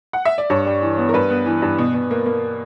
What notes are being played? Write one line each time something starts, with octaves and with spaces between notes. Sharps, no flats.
F#5
E5
D5
G2 C#5
G3
E3
B3
A#4
G2 B4
B3
E3
G2
B2
B2
A#3
A#3